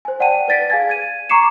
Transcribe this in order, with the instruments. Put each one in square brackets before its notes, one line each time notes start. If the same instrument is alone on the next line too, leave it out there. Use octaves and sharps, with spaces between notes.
[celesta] C5 G#5
D5 F#5 G5 A5 D#7
B4 D5 A6 B6 D7
G#4 F5 G#5 G#6 A6
G#6 D#7
A#5 C#6 D6 C7 C#7 E7